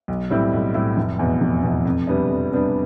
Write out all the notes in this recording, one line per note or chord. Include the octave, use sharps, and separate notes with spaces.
B1
A2 G3 C4 E4
B1
A2 G3 C4 E4
F1
E2 B2
F1
E2 B2
F2
C3 G3 B3 D4
F2
C3 G3 B3 D4